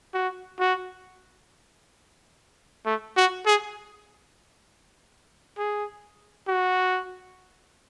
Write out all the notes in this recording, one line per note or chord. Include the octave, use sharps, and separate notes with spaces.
F#4
F#4
A3
F#4
G#4
G#4
F#4